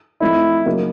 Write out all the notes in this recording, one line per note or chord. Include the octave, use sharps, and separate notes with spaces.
F3 A3 C4 D#4 E4
C#3 F#3 A#3 D#4 F#4